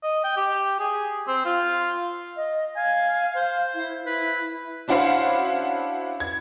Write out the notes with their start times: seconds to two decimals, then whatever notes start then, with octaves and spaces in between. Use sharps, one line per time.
0.03 D#5
0.24 G5
0.37 G4
0.80 G#4
1.28 C4
1.45 F4
2.37 D#5
2.76 F5 G#5
3.36 C5
3.75 E4
4.06 E4 B4
4.88 C#4 D4 E4 F#4 C5 F5
6.20 G#6